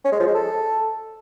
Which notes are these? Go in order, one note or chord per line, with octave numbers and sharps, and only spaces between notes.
C#4
G#3
F3
G#3
A4